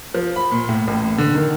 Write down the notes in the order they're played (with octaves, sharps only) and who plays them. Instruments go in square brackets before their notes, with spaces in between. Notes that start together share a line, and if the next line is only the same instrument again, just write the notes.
[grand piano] F3
B5
A#2
A2
A1
D3
D#3